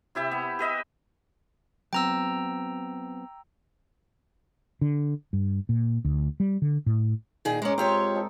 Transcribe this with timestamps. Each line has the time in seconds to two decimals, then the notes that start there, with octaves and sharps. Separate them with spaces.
0.15 C3 E4 G4 E5
0.31 B3
0.59 G4 B4 D#5 E5
1.93 F#3 B3 C4 G5 A#5 E6
4.81 D3
5.33 G2
5.69 A#2
6.05 D2
6.40 G3
6.62 D3
6.86 A2
7.45 A#2 D#3 G#4
7.62 G#2 G#3 C#4 A#4 D6
7.78 C4 F4 G4 C#5
8.15 D#4 A4